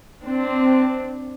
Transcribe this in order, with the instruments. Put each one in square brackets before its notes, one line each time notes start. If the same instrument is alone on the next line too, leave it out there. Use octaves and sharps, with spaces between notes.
[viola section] C4 D4